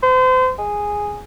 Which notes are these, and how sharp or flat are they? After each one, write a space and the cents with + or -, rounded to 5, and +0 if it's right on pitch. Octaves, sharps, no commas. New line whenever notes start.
C5 -35
G#4 -5